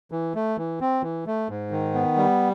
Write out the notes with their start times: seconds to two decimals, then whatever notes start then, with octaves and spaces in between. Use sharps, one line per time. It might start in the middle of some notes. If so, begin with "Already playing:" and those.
0.12 E3
0.35 A3
0.58 E3
0.81 C4
1.03 E3
1.26 A3
1.49 G#2
1.71 D#3
1.94 B3
2.17 G3